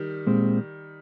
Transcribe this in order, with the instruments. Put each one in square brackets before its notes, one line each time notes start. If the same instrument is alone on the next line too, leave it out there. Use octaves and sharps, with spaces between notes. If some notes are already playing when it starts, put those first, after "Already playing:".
Already playing: [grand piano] D#3 G3
[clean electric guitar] A#2 G#3 C4